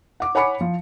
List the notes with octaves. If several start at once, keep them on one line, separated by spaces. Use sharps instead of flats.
F#5 D6
C#5 F#5 G#5 B5 D6 C#7
F3